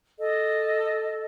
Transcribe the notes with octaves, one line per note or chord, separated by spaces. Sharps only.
A4 D#5